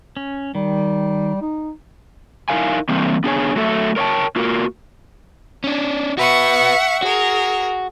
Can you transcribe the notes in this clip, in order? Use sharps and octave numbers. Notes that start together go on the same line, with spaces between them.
C#4
D#3 G3
D#4
D#4 E4 A#4 F5 G#5
E3 G3 A#3 C4
B3 D4 G#4 A4 C#5 G#5
F#3 A3 A4 E5
A#4 C#5 D#5 G5 A5
A#3 F4 F#4 A#4
C#4 D4
F#4 B4 E5 F#5 C#6
F#4 G#4 A#4